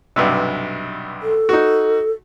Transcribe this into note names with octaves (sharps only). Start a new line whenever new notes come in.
B1 G2 C3
A4
D#4 F#4